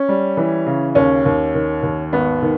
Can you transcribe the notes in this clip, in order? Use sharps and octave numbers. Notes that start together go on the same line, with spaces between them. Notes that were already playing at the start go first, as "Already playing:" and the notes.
Already playing: C#4
G3
E3
C#3
D#2 C#4
D#2
D#3
D#2
G#1 B3
D#3